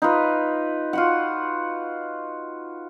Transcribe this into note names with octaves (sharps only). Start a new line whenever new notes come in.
D#4 F4 B4
F4 F#4 F#5